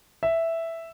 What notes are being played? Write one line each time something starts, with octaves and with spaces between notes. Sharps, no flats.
E5